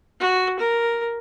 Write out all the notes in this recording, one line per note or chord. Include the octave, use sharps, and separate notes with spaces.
F#4
A#4